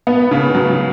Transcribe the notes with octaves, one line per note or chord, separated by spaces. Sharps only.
B3
C#3
F#3